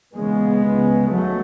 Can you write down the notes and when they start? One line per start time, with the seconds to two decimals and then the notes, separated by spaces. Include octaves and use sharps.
0.16 E2 C#3 G#3 B3
0.63 C#2 C#3
1.11 D#2 C#3 F#3 A3